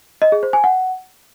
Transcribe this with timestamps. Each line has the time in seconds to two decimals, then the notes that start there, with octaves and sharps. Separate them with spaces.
0.22 D#5
0.32 G#4
0.43 C5
0.53 G#5
0.64 F#5